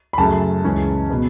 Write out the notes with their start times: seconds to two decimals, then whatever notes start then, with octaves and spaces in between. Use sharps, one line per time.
0.13 B5
0.18 F#2 C#3 A3 A5
0.64 C#2 C#3 E3 C#4
1.10 B2 B3